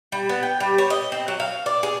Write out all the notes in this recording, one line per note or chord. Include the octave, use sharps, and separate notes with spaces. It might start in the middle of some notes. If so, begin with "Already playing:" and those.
G3
B3
G5
G3
C#5
D#5
C4
F#3
F5
D5
G#4